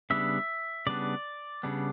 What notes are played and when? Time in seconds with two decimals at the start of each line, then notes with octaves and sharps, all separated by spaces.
0.10 C#3 G3 B3 D4 E5
0.87 C#3 G3 B3 D4 D5
1.63 C#3 G3 B3 D4